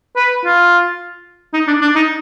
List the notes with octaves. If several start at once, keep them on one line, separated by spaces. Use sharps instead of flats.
B4
F4
D#4
D4
D4
D#4